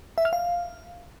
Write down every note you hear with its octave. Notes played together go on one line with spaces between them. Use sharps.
E5
F6
F5